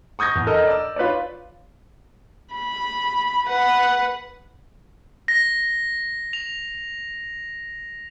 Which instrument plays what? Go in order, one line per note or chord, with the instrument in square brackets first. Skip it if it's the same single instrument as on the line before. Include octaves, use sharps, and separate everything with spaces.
[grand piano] C#6 D#6 G6 G#6 A#6
E2
A4 A#4 D#5
D5 E6
F4 B4 C#5 D5
[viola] B5
B4 F#5
[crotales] A#6
F7